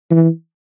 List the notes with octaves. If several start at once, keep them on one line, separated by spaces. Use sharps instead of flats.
E3